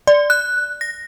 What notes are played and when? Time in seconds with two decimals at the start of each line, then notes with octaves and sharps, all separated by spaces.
0.07 D5
0.30 F#6
0.81 A#6